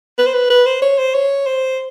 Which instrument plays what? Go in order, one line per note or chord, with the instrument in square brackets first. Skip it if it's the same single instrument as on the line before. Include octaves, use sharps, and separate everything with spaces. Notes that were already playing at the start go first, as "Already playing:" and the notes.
[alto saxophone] B4
C5
B4
B4
C5
C#5
C5
C#5
C5